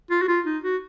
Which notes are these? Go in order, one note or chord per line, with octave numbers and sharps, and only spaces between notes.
F4
F#4
F4
D#4
F#4